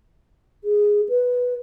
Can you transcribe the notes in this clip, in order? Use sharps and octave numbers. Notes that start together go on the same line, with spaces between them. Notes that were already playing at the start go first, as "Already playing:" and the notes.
G#4
B4